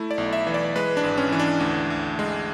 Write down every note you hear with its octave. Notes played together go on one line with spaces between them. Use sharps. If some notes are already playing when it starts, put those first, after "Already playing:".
Already playing: A3 E4
D5
B1
E5
E3
D5
G#3 B4
D4
G#1
C#4
E3
D4
D2
D2
G#3